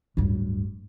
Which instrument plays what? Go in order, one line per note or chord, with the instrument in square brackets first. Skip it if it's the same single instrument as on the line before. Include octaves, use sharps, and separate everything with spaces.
[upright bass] D1 G2